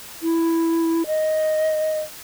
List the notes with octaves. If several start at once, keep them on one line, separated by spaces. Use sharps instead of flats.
E4
D#5